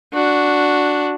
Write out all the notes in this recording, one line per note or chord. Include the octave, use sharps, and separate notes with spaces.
D4 F#4